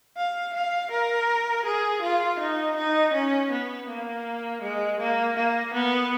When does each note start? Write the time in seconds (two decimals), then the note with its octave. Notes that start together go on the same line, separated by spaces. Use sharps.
0.17 F5
0.54 F5
0.91 A#4
1.65 G#4
2.02 F4
2.39 D#4
2.77 D#4
3.13 C#4
3.51 B3
3.88 A#3
4.62 G#3
5.00 A#3
5.36 A#3
5.74 B3